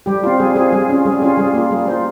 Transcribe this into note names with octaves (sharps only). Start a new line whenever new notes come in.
G3 G4
C4 F4
G3 G#4
C4 F4 G#4
G3 G#4
C#4 F4
G3 G#4
C#4 F4 G#4
G3 G#4
A#3 F4
G3 G#4
A#3 F4 C5